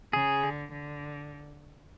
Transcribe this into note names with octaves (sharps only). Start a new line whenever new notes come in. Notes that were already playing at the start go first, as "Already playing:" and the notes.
C#3 G#4
D3
D3